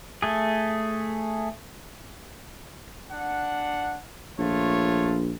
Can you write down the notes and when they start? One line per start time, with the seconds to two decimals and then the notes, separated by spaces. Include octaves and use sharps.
0.22 A3 G#4
3.11 D4 F#5
4.39 A#1 A3 F4 C#5